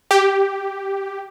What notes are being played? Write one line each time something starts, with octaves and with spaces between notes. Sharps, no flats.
G4